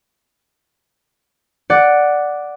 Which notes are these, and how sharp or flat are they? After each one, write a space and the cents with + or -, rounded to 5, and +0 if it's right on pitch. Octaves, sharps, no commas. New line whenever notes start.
D5 +0 F#5 +0